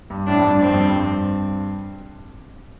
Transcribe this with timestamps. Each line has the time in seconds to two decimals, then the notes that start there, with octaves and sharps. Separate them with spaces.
0.10 G2
0.27 A2 D4
0.39 F2
0.44 G2
0.61 G2 C4
0.74 F2
0.88 G2